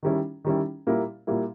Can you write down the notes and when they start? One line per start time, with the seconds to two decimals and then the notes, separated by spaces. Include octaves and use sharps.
0.03 D#3 G3 C#4 E4
0.44 D#3 G3 C#4 E4
0.87 A#2 G3 A#3 E4
1.27 A#2 G3 A#3 E4